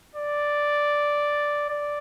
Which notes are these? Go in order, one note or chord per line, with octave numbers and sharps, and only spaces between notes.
D5
D5